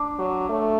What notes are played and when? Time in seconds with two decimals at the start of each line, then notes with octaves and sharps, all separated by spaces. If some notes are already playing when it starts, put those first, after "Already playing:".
Already playing: D4
0.19 F#3
0.49 A3